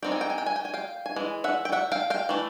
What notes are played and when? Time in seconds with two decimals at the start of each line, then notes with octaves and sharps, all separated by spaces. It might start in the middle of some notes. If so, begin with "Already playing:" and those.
0.03 G3 C4 D#4 G5
0.12 G#5
0.21 G5
0.30 G#5
0.38 G5
0.46 G#5
0.56 G5
0.65 G#5
0.74 F5 G5
1.06 G#5
1.16 E3 G#3
1.44 E5 F#5
1.65 G5
1.72 E5 F#5
1.92 F5 G5
2.10 F5 G5
2.29 E3 A3